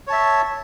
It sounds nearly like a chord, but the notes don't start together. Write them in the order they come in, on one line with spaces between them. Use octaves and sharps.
C#5 A5 E5